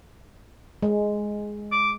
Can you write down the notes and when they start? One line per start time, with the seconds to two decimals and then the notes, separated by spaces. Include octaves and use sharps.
0.83 G#3
1.72 D6